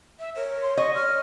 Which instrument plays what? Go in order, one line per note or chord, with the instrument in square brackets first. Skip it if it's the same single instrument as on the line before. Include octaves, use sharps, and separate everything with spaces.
[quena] E5
[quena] A#4 [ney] C#5
[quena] C6
[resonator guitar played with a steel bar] D#5 [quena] C#6
[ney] C#5 [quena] F6